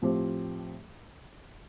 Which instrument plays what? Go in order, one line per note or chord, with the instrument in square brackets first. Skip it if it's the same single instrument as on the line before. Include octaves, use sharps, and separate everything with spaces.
[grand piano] A2 F3 C4 G4